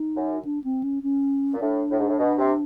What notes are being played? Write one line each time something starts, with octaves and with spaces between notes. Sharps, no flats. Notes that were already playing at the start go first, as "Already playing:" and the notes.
Already playing: D#4
F#2
D4
C4
C#4
C#4
A#2
A2 D4
A2
G#2
A2
B2
C3